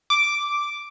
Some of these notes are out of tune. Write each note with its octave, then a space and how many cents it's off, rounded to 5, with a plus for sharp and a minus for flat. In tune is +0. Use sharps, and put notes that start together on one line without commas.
D6 +0